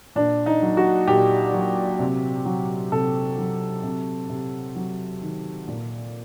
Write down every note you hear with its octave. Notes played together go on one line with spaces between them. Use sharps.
A#2 D4
D#4
F#3
F#4
A#2 G4
F#3
C3
F#3
C3 A4
F#3
C3
C3
F#3
D#3
A#2